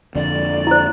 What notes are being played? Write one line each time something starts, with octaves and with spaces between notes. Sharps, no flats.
F2 D3 D5
E4 C5